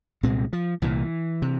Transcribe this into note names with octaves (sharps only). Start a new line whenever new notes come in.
C2 A#2 G#3 C4
F3
C2 A#2 E3
C3